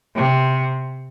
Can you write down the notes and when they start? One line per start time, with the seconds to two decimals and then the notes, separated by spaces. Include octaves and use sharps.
0.17 C3